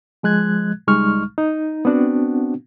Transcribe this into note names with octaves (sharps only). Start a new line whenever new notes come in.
F3 G#3 F#6 G#6
C#2 G3 G#3 D#4 C#6 F6
D#4
B3 C4 D4 F#4